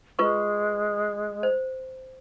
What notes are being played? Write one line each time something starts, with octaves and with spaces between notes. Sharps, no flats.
G#3 F4 B4 C#6
C5